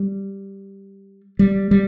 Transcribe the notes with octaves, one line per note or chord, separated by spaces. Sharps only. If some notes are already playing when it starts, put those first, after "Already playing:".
Already playing: G3
G3
G3